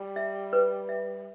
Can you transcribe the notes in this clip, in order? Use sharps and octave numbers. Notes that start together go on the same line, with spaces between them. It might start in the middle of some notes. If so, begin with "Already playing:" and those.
Already playing: G3
E5
B4
E5